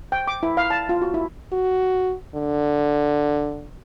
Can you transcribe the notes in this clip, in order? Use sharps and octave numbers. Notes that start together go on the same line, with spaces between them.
G5
D6
E4
F5
A5
F4
F#4
E4
F#4
D3